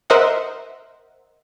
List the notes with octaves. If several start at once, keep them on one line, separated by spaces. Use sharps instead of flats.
A#4 C5 D#5 E5 F#5